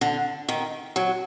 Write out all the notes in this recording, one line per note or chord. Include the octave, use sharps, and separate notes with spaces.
D3
D#3
F#3